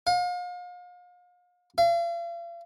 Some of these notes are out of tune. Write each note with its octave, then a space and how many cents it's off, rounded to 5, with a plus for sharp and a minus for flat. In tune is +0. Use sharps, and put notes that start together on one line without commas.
F5 +40
F5 -40